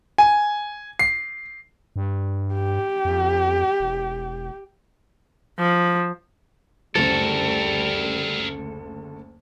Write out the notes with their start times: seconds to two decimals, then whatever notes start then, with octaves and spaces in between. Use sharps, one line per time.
0.18 G#5
0.99 C7
1.96 G2
2.54 G4
3.05 F2
3.80 E1
5.59 F3
6.96 F#1 D2 C#3 G3 F#4 A4 A#4